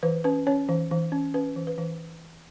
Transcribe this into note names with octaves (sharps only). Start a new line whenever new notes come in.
E3 B4
C#4 B4
C#4 C#5
E3
E3
C#4
C#4 B4
E3
B4
E3